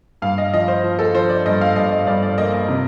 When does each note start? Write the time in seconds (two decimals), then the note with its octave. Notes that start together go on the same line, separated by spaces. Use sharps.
0.22 G2 F5
0.38 D#5
0.53 F3 D#5
0.68 C5
0.84 F3
0.99 A4
1.14 F3 C5
1.29 D5
1.46 G2 D#5
1.61 F5
1.76 G2 D#5
1.92 D#5
2.07 G2 D5
2.22 D5
2.38 A#3 D#5
2.54 D#5
2.68 C3